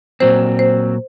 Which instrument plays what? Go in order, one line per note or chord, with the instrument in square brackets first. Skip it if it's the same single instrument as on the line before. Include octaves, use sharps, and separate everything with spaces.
[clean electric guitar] A#2 F#3 C4 [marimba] C5
[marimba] C5